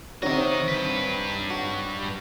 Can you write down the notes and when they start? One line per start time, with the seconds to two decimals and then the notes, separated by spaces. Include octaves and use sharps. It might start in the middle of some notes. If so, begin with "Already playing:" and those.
0.23 C3 D#3 C4 D#4 F#4 C#5 D#5
0.68 G2 B4
1.50 F#4